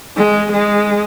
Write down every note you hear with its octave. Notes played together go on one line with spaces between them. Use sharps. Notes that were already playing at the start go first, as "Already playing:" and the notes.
G#3
G#3